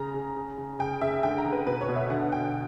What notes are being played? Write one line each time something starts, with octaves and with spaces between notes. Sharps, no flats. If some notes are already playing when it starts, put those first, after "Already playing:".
Already playing: C#3 A#5
C#3
C#3
C#3
C#3 G5
C#3 E5
D3 G5
A#5
D3
B4
B2 B4
C#5
B2
E5
D3 F#5
D3 G5